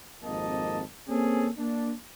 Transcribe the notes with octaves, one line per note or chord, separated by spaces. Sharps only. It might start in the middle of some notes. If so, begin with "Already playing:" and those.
G#1 F2 A#3 D#5 A5
A#3 C4 C#4 G#4 A4
A#3 D4